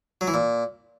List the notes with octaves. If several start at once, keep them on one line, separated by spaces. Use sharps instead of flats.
F#3
E3
A#2